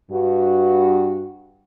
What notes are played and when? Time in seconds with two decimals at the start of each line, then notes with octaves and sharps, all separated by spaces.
0.11 G2 F#4